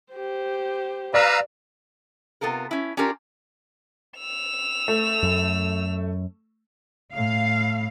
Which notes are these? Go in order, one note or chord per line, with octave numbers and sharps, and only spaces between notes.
G4 C5
B4 D5 F5 A#5 E6
C3 B3 F4 A4 A#4
C#4 E4
C#4 D4 F4 G4 A#4
E6 F7
A3
F#2
A2 F5